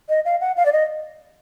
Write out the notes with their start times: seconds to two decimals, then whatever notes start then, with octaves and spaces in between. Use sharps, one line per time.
0.09 D#5
0.25 F5
0.41 F#5
0.57 F5
0.66 D5
0.73 D#5